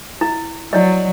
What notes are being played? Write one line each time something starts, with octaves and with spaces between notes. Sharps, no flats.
E4
F#3 E4 D5 D#5